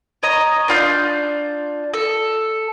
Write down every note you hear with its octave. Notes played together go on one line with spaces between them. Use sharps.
C#5 D#5 A#5
D4 F4 G6
A4